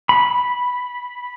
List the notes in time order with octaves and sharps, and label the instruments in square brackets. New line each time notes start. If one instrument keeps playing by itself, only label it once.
[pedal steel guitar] B5